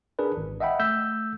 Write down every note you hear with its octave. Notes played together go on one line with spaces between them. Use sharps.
D4 G#4 A#4 B4
G#1
D#5 E5 F#5 G5 B5
A3 E6 G6 B6